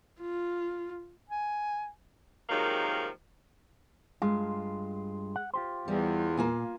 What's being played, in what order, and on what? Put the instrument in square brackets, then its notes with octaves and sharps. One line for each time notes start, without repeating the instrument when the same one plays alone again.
[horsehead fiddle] F4
[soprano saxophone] G#5
[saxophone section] C3 D#3 F3 F#3 G#3 A#3
[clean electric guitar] G2 F4 [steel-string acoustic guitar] G#3
[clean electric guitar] F#5
F4 G4 C5
[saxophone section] E2 [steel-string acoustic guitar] G3
[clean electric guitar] A#2 [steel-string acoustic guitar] A#3 F4 G#5